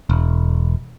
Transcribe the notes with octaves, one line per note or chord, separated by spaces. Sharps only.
E1